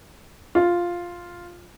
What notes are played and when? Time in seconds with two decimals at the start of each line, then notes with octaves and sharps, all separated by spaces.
0.55 F4